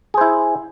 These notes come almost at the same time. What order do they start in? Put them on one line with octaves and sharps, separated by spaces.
G#4 C5 E4